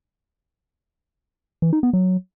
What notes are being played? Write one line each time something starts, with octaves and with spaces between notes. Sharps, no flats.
E3
D#4
B3
F#3